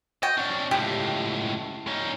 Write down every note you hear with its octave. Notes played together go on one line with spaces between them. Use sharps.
F#4 D#5 G5
C#4 D4
C#2 A2 G4
C#4 D#4